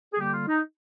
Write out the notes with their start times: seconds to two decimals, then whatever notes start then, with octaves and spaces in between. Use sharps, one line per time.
0.13 G#4
0.19 D3 G3 A#3 G4
0.34 F4
0.48 D#4